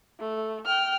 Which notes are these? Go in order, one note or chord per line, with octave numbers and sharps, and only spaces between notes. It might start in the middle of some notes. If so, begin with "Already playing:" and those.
A3
G5 F6